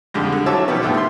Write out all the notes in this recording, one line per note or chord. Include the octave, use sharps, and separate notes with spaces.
F2 D3 G3 G#3
D3
E3 F#3 C#5 A5 D6 E6
B2 D#3 F3 G3 B3
D#2 A3 F4 D6
E5 C6